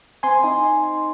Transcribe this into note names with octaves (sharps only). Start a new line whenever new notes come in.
C4 G#5 C6
D#4